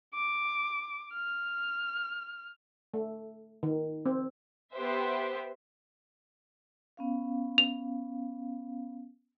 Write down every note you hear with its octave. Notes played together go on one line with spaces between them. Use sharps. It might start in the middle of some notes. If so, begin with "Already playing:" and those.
D6
F6
A3
D#3
C4
B3 G4 B4 C5 E5
B3 C#4 F5
F7